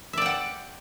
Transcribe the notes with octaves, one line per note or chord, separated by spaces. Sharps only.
D5 E5 F#5 G5